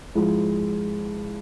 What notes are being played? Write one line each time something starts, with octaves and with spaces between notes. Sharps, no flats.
G#2 F3 G#3 E4